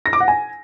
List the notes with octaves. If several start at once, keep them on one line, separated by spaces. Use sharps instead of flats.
A#6
D6
F#5
G#5